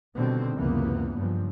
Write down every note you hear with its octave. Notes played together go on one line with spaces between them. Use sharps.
B2 D3 D#3 G3 C4
F#1 C#2 C3 E3 A#3 B3
G2 C#3 F3